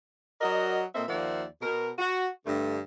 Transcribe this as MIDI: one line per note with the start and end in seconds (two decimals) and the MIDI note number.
0.41 0.81 54
0.41 0.81 66
0.41 0.81 70
0.41 0.81 74
0.41 0.81 75
0.95 1.04 46
0.95 1.04 58
0.95 1.04 60
0.95 1.04 69
0.95 1.04 75
0.95 1.04 76
1.08 1.44 39
1.08 1.44 53
1.08 1.44 58
1.08 1.44 74
1.08 1.44 76
1.08 1.44 78
1.61 1.89 47
1.61 1.89 70
1.99 2.28 66
2.46 2.79 43
2.46 2.79 50
2.46 2.79 57